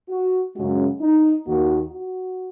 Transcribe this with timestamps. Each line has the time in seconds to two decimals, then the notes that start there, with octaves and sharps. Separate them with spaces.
0.09 F#4
0.55 F#2 C#3 G#3 C#4 F#4
1.01 D#4
1.46 D#2 D#3 A#3 F#4
1.91 F#4